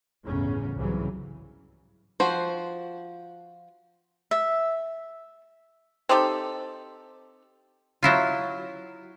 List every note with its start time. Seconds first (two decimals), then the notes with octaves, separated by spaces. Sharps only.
0.25 G1 E2 A2 C#3 C#4
0.77 C2 G#2 C#3 E3 F#3
2.20 F3 F#4 C5
4.31 E5
6.09 C4 D#4 G4 A4
8.03 F#3 E4 F4